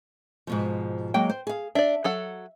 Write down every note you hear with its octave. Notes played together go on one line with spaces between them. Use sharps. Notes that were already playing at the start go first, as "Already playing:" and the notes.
G#2 B2 F3
F#3 G#3 A#3 G5
C5
G#4 F5
D4 D5 E5
F#3 A4 F#5